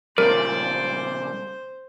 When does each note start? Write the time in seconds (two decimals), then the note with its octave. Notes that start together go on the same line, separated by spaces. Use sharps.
0.18 A#2 C#3 G3 A#4 C5 D5